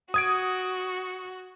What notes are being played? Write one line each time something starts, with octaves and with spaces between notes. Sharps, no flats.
F#4 D#6 G#6 D7